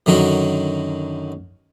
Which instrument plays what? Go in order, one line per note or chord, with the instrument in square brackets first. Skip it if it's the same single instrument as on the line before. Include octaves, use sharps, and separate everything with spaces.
[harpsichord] F#2 D3 D#3 F#3 F#4